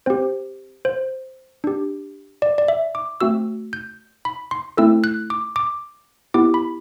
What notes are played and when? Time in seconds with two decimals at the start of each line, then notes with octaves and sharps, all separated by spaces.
0.06 C4 G4 C5
0.85 C5
1.64 D4 G4
2.42 D5
2.58 D5
2.68 E5
2.95 D6
3.20 A3 C4 F#4 E6
3.73 G6
4.25 B5
4.51 C6
4.77 A3 C4 E4 A4 E6
5.04 F#6
5.30 D6
5.56 D6
6.34 B3 E4 G4 D6
6.54 B5